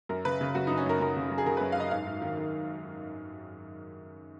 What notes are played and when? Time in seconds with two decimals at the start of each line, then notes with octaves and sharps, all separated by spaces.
0.09 F#2 A#4
0.25 C#3 B4
0.41 C#3
0.55 F#2 F#4
0.67 F#2 D#4
0.77 C#4
0.86 F#2 A#4
1.00 F#2 A#4
1.16 C#3
1.31 F#2
1.38 G#4
1.46 C#3 A#4
1.57 F#2 B4
1.72 F5
1.77 F#2 D#5
1.91 G#2 F5
2.06 G#2
2.22 D#3
2.37 D#3